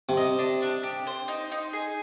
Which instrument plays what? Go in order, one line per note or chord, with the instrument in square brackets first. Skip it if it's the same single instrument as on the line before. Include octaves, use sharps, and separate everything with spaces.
[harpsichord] C3
[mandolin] D#5
D4
D4
G4
C5
D#4
D#4
G#4